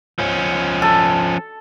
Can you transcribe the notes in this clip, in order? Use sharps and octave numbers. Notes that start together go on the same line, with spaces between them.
F3 C#4
A4